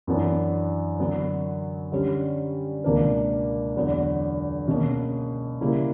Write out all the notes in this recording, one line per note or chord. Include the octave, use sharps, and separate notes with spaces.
F#2 E3 B3 D4
D3 F#3 B3
D3 G3 C#4
C#2 B2 A#3 D4 A#4
E2 D3 F#3 B3 D4
B2 A#3 C#4
C#3 G3 A#3 E4